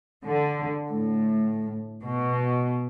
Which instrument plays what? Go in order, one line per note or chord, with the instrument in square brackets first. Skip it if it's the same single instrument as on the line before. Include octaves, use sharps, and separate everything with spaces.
[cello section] D3
A2
B2